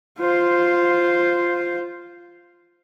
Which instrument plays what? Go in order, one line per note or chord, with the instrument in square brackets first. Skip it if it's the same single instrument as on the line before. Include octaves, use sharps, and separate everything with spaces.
[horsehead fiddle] F4 C5